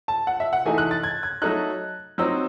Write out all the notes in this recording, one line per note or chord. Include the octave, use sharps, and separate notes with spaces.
A5
F#5
E5
F#5
E3 A3 D#4 G#5
F#6
A6
G#6
G#6
F#3 A3 D#4 F#6
F#3 C4 D#4 E6